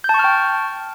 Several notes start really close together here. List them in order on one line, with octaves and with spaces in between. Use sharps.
G6 A5 C#6 F6 G5